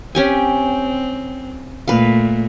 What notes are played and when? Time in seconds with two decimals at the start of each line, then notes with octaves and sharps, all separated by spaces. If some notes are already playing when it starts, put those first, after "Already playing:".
0.15 C4 C#4 G4 G#5
1.88 A#2 A3 B4 F5